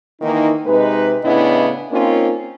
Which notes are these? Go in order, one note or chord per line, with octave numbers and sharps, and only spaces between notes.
D#3 E3 A#3 D#4
C3 G#3 D#4 B4
A2 C#3 B3 D4 E4 D#5
A#3 C4 C#4 D#4 F4 A#4